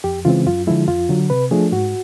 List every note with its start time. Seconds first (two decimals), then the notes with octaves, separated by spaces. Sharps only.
0.04 F2 G4
0.25 C#3 E3 G#3 C4 F4
0.46 F#2 F4
0.67 D3 F3 G#3 E4
0.88 F2 F4
1.09 D3 F#3
1.30 C3 B4
1.51 F3 A3 D4 G#4
1.72 G#2 F#4